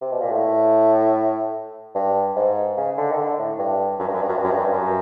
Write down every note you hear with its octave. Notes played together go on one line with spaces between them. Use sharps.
C3
B2
A#2
A2
G2
G#2
C#3
D3
D#3
D3
A2
G2
F#2
G2
F#2
G2
F#2
G2
F#2
G2
F#2
G2
F#2